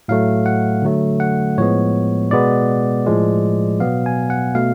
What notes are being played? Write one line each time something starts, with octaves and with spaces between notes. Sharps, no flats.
A2 F#3 A3 F5
F#5
D3 F#3 A3
F#5
A2 F3 G#3 B3 C#5
B2 G#3 B3 D5
A2 F3 G#3
B2 F#3 B3 F5
G#5
F#5
B2 A3 F5